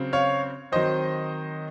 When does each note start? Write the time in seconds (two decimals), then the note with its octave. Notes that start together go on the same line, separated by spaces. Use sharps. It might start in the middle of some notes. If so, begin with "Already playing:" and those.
Already playing: C#3 F#3 C4
0.13 C#5 F5
0.72 D#3 F#3 C4 C5 D#5